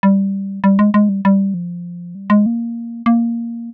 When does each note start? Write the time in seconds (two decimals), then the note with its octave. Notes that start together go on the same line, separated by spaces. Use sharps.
0.03 G3
0.64 G3
0.79 G#3
0.94 G#3
1.09 G3
1.25 G3
1.54 F3
2.15 G3
2.30 G#3
2.46 A#3
3.06 A#3